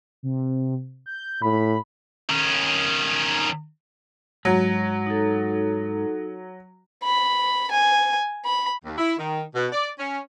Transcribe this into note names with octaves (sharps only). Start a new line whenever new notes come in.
C3
G6
A2 B5
D#3 C#4
G#2 F#3
D#4 A4
B5
G#5
B5
D#2
E4
D#3
B2
D5
C#4